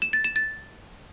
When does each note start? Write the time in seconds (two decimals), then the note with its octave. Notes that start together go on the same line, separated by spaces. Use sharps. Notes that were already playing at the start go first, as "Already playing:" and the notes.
0.02 E7
0.13 A6
0.24 E7
0.36 A6